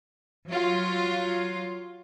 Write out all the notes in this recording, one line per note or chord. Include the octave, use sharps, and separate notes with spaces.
F#3 F4